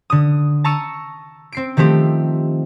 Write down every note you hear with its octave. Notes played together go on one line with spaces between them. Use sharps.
D3 D#6
A5 A#5 C#6 E6 C#7 D#7
C4 C7 D7
D#3 F3 A3 C4 G4